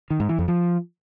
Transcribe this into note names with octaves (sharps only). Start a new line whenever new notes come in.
D#3
G#2
E3
F2
F3